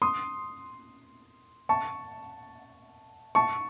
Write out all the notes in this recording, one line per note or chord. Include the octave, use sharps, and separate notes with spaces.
C6 D#6
A5 C#6
A5 C#6